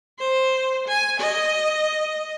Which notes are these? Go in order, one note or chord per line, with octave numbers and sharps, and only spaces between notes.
C5
G#5
D#5